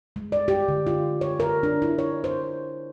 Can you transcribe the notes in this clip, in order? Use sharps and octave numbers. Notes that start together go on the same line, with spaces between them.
G#3
D5
G4
D3
F4
C#5
A#4
D4
E4
C#5
C5